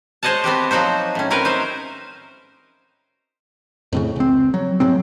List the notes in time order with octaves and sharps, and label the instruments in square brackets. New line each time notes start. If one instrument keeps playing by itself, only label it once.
[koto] G#3 C5 C#5 D#5 F#5 A5
B3 C4 F#4 G4
F3 F#3 D#4 F#4 C5
A2 C#4
C4 C#4 F#4 A#4 B4
D#4 C5 E5
[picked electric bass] F2 A2 C#3
C#2 C4
F#3
G#2 C#3 F#3 C4